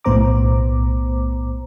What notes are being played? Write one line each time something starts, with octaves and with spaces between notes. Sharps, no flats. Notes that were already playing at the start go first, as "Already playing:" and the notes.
B1 A2 B3 C5 A#5 D6